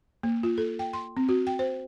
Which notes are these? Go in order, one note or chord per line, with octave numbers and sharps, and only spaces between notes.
A#3
F4
A4
G5
C6
C4
F#4
G5
C5